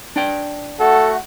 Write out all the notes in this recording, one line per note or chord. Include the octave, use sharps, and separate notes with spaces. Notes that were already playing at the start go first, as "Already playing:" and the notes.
D4 D5 G5
A3 F#4 A4 F#5